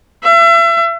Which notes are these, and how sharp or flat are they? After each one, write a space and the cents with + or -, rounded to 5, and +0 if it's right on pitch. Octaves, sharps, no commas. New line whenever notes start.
E5 +35